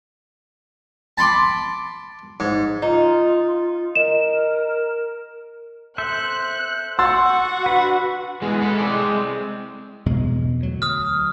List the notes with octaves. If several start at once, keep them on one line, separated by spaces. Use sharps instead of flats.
A5 B5 C6 D6
G#2
D#4 F4
A#4 D#5 E7
A4 C5 E5 F#6
F#4 F#5 C6 E6 A6
D4 B4
E3 G#3 B3
A4 B4
C4 D5
E2 B2 G#3
D2 F#3
D#6 F6